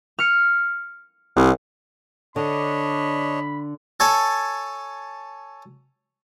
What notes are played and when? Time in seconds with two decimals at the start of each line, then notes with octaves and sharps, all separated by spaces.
0.19 F6 C#7
1.37 C2
2.36 D3 D4 C#5 D#5 B5
4.00 A4 C#5 G#5 A5